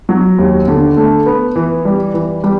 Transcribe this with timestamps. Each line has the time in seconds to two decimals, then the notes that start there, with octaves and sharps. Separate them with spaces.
0.09 F#3
0.38 D#2
0.68 D3
0.97 A3
1.26 B3
1.56 E3
1.85 G3
2.14 E3
2.44 G3